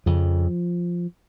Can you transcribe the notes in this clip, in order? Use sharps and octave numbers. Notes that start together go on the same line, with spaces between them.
F2 C#3 F3